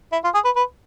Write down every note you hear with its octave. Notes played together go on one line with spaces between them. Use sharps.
E4
F4
G#4
B4
B4